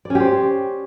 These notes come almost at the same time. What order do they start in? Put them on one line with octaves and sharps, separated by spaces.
D5 C#4 G4 C5